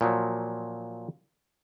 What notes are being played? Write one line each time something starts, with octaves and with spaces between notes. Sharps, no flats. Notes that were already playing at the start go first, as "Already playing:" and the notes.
A#2 F3 F#3